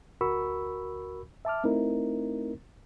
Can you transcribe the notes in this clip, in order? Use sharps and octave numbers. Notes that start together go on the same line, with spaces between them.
D2 F#4 A#4 B5 C#6 E6
E5 A5 D6 F6
A3 C4 D#4 E4 A#4